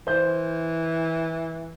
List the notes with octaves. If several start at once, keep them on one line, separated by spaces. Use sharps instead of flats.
E3 C5 G6